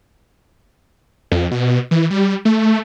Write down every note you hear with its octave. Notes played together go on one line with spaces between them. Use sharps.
F2
B2
E3
G3
A3